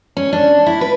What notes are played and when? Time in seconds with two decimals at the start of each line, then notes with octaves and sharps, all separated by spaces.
0.17 C#4
0.33 D4
0.66 E4
0.81 B4